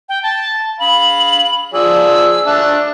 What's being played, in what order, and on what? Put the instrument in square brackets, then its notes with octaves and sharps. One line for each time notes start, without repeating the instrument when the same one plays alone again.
[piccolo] G5
A5
[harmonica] F5 B5 [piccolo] F#7
[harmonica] F3 G#4 D5 [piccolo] E6
[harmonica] D4 E5 A5 [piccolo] F#6